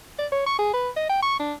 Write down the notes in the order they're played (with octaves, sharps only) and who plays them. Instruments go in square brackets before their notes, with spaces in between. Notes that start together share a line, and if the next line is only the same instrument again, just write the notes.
[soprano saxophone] D5
C#5
C#6
G#4
B4
D#5
G5
C#6
D4